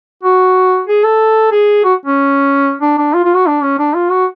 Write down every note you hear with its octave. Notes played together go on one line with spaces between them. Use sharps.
F#4
G#4
A4
G#4
F#4
C#4
D4
D4
F4
F4
F#4
D4
C#4
D4
F4
F#4